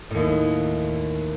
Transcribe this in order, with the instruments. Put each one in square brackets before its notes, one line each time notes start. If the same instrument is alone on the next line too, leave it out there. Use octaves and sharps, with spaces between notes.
[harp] D#2 A2